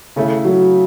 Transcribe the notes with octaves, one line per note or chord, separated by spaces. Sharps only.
C#3 A3 E4
F#3